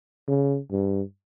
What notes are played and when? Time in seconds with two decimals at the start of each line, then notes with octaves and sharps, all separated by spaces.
0.28 C#3
0.71 G2